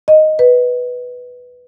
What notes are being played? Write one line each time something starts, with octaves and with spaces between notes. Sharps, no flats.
D#5
B4